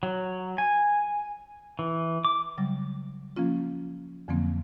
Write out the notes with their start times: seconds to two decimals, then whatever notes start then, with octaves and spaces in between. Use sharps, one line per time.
0.03 F#3
0.58 G#5
1.79 E3
2.25 D6
2.58 C#3 F#3 G3
3.36 F3 A#3 C#4 F4
4.28 F2 D3 F3 F#3 A#3 C4